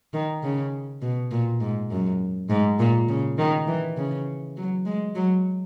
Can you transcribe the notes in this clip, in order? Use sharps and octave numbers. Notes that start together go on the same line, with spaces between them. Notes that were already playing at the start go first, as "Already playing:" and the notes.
D#3
C#3
B2
A#2
G#2
F#2
G#2
A#2
C#3
D#3
E3
C#3
F#3
G#3
F#3